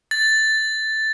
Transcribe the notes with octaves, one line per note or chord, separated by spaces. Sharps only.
A6